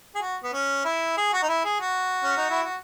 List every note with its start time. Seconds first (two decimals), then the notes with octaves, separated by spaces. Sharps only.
0.15 G#4
0.21 F#4
0.43 B3
0.53 C#4
0.84 E4
1.17 G#4
1.33 F#4
1.43 D#4
1.49 E4
1.65 G#4
1.80 F#4
2.24 C#4
2.37 D#4
2.50 E4
2.63 F#4